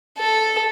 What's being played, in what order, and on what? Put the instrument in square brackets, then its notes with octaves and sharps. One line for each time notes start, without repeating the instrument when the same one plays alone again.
[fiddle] A4